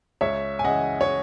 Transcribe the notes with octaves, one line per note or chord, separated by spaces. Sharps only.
C#2 C#5 E5
G#5
C#3 E3 D#5 F#5
C#5